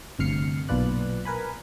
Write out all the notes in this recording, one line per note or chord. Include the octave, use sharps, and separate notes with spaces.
G1 D2 C3 F6 C7 C#7
B1 A#2 F4 B4 D5 F#6
A#4 B4 G#5 B5